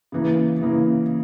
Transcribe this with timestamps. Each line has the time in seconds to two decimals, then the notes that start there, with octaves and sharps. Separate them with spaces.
0.12 C#3 E3 A#3
0.61 C#3 E3 A#3